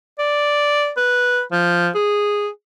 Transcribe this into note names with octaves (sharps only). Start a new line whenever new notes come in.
D5
B4
F3
G#4